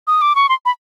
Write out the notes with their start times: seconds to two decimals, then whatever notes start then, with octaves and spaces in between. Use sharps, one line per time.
0.07 D#6
0.22 D6
0.35 C#6
0.49 C6
0.65 B5